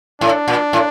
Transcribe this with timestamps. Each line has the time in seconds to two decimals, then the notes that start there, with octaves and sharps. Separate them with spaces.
0.21 A2 D4
0.48 A#2
0.73 A2